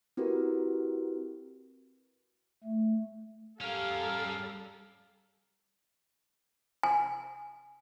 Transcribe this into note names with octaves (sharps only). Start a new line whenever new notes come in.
C4 E4 F#4 G4 A#4 B4
A3
G3 C#4 A4 A#4 F5
G#5